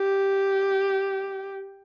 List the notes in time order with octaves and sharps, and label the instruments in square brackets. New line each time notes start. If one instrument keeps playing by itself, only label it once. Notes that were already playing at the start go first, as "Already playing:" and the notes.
Already playing: [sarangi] G4